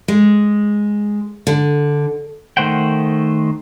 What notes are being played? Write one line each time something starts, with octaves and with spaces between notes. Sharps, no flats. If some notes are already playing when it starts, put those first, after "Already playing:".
G#3
D3
D#3 A3 C5 F#5 G5